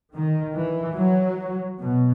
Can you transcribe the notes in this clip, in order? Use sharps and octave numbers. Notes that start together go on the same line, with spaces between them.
D#3
E3
F#3
B2